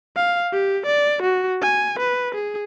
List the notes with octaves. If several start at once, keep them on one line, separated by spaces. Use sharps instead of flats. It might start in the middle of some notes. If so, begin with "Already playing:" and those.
F5
G4
D5
F#4
G#5
B4
G#4